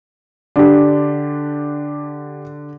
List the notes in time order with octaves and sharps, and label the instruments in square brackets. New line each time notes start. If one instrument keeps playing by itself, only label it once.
[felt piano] D3 [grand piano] D4 G4